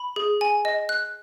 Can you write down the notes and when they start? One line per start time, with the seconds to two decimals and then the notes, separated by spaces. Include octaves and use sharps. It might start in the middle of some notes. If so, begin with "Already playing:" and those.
Already playing: B5
0.16 G#4
0.41 G#5
0.65 D#5
0.89 F#6